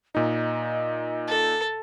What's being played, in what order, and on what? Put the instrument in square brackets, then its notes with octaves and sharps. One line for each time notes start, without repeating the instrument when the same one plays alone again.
[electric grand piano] A#2 D#4 [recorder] D#5
[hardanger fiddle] A4